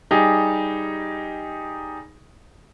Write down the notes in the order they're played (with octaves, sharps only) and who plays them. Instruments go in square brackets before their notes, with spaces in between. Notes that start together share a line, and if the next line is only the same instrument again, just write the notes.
[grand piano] G3 D#4 G4 G#4